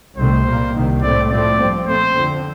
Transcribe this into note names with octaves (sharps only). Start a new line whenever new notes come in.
C2 C3 D#3 A3 C5
C2 A#2 G3 A#3
C2 C3 D#3
A2 A3 C4 D5
A2 F3 A3 C4 D5
G2 F3 C4
A#2 A3 C4 C5
F2 D3 F3 C4